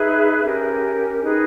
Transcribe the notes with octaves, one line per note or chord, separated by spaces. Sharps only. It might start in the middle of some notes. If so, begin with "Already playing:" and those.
Already playing: D#4 G#4 B4 E5
C#4 G4 A#4
D#4 G#4 B4 D#5